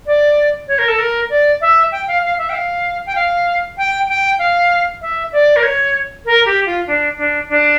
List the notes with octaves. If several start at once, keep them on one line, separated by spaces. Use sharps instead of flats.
D5
C#5
A#4
A4
A#4
D5
E5
G5
F5
F5
E5
G5
F5
G5
F5
G5
G5
F5
E5
D5
A#4
C#5
A#4
G4
F4
D4
D4
D4